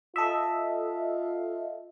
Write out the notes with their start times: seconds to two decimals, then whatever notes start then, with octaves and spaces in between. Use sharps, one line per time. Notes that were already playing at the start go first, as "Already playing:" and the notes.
0.16 F4 A4 D#5 E5